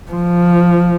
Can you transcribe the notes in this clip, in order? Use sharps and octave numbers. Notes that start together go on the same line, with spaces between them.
F3